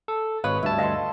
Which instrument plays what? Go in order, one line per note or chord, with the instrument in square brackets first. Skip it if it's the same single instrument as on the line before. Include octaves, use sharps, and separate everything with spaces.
[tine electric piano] A4
[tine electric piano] G#1 B4 [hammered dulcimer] C#5 D#5 [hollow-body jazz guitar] F5
[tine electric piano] D2 G2 A5 [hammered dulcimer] E4
[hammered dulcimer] A4 C6 [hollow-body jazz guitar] D#5 F5